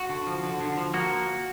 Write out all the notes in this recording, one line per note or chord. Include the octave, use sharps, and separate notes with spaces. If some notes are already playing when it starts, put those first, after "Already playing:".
Already playing: F#4
D3
F3
D3
D3
F3
A#3 F#4